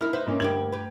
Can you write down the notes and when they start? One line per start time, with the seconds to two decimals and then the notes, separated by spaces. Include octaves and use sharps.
0.01 D#4 E4 A#4 F6
0.13 D#4 B4 C5 E5
0.27 G#2 A#3 C#4
0.40 D2 G2 A#3 G4 G#6 F#7
0.72 G4 B4